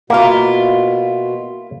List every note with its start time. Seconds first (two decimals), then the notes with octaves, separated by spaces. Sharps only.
0.10 B2 A#3 E4 F4 A#4